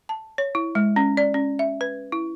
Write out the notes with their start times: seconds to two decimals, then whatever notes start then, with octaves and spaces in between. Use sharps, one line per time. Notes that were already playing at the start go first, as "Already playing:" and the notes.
0.09 A5
0.38 C#5
0.55 E4
0.75 G#3
0.96 C#4
1.17 D5
1.34 C#4
1.59 E5
1.81 B4
2.12 E4